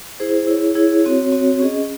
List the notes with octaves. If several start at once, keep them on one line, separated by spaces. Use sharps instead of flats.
E4 G#4 C5
E4 G#4 C#5
E4 G#4 C#5
C4 F#4 C#5
C4 F#4 C#5
C#4 G#4 D#5